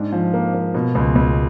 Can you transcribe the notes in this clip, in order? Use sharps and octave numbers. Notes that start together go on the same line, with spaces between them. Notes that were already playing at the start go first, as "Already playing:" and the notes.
Already playing: G#2 D4
F3
A#3
A#3
B2
C#2
C#2